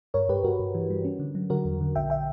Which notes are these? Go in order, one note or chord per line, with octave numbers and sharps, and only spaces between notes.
G2 A#4 C#5
G2 G4 B4
G2 F#4 A#4
G2
E3
G3
C#4
D3
F#3
D3 F#4 A#4
E2
D3
A#1 E5 G5
E5 G5